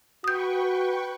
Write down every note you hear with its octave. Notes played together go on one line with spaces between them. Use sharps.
F#4 B4 G5 C#6 D#6 G6